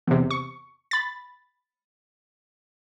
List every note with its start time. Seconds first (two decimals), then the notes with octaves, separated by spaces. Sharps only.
0.07 E2 C3
0.31 C#6
0.91 B5 A6